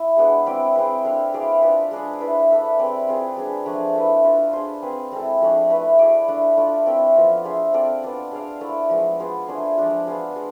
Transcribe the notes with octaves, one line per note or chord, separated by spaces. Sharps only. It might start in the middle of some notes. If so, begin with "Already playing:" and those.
Already playing: E4
G#3 B3 D4 G#4
C4 E4 B4 D5
C4 G#4 B4
D4 A4 D5 F5
E4 G#4 D5 F5
D4 F4 B4
G#3 D4 G#4
E4 B4 D5
D4 A4 E5
C4 G#4 B4 D5
C4 F4 G#4 B4
G#3 D4 G#4
F3 A3 D4 G#4
A3 E4 B4
D4 F4 B4
D4 G#4 C5
C4 G#4 B4
G#3 C4 E4 A4
F3 A3 D4 G#4
A3 E4 B4
E4 G#4 D5
A3 D4 A4
A3 D4 F4
C4 E4 A4 E5
F3 B3 F4
D4 G#4 C5 E5
C4 F4 A4 D5
B3 D4 F4
D4 G#4 D5 F5
A3 E4 A4 C5
F3 G#3 B3
B3 F4 G#4 C5
A3 D4 G#4 C5
F3 G#3 D4 F4
B3 F4 G#4
G#3